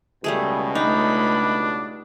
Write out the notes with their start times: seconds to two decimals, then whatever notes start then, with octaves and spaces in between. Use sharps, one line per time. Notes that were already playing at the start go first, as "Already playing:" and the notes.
0.24 C#2 B2 G3 A3 G#4
0.75 A3 D4 D#4 B5